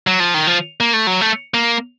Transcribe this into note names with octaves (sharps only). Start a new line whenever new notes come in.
F#3
F3
D#3
F3
A#3
A3
F#3
A3
A#3